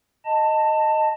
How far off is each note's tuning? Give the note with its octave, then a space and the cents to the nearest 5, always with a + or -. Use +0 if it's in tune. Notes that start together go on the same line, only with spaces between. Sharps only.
D#5 +0 A5 +15